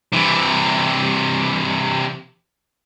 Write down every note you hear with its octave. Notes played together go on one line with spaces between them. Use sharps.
C3 E3